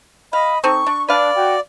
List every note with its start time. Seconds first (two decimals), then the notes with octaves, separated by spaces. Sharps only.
0.33 D#5 F5 B5
0.64 C4 D#4 A4 C#6
0.87 D4
1.09 D4 B4 D5 F5
1.35 F#4 G5